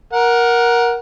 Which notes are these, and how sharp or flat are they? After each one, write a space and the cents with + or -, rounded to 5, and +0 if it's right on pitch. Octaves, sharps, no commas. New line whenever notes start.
A#4 +15 F#5 +0